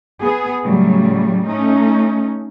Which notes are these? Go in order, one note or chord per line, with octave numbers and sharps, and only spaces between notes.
B3 G#4
A2 C#3 F#3 G3
A3 C#4 D#4